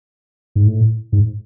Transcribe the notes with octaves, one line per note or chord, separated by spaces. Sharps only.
G#2
A2
G#2